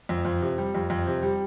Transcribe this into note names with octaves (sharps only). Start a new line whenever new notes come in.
F2
F2
C3
G3
F2
F2
C3
G3